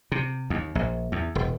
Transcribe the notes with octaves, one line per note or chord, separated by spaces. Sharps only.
C3
D#2
A#1
E2
E1